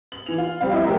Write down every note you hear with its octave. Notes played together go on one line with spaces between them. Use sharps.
F#7
E3 F7
F4
F3 G3 C4 F5
E4 D#5 E5
F#3 A3 A#3 G4 G#4 A#4